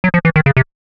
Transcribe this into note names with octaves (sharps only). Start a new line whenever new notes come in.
F#3
F3
E3
D#3
C#3
C3